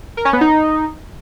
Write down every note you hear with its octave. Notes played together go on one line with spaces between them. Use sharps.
A#4
C#4
B3
D#4